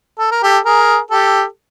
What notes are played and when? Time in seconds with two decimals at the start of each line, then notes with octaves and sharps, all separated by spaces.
0.19 A4
0.31 A#4
0.43 G4 A4
0.65 G#4 A#4
1.11 G4 A4